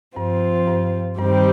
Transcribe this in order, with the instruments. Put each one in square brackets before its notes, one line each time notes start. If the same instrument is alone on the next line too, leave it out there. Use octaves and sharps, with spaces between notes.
[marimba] G2 [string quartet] F3 C4 F4
[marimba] G2
[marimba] G2 [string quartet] D#3 G3 C4 G4